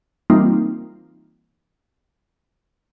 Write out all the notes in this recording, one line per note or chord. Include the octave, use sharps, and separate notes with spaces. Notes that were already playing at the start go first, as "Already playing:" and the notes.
E3 G3 A#3 C4 D#4 F4